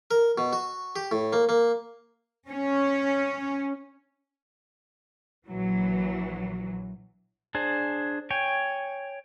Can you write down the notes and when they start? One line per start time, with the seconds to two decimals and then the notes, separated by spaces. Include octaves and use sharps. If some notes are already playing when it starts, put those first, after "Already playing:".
0.11 A#4
0.38 B2
0.53 F#4
0.96 G4
1.11 A2
1.33 A#3
1.49 A#3
2.49 C#4
5.48 A#1 E3 F#3
7.55 D4 G#4 C5
8.30 C#5 G5 G#5